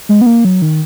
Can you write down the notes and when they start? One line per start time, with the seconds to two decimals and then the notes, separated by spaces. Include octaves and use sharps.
0.09 G#3
0.21 B3
0.26 A#3
0.45 F#3
0.62 D#3